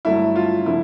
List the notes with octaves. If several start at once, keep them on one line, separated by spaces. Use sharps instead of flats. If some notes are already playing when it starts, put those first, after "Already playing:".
G2 D3 F#3 A3 E4
F4
D3 F3 E4